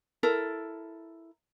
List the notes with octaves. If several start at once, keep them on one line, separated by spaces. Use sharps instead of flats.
E4 A4 A#4